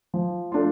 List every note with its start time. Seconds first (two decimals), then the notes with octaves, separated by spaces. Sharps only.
0.14 F3
0.52 A3 D4 F4